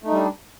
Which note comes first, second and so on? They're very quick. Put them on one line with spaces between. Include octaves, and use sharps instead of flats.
A3 D#4 G3 D4